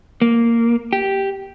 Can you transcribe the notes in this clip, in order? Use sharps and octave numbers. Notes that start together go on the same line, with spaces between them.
A#3
G4